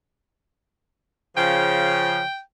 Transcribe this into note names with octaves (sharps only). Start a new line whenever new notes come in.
C#3 F3 G5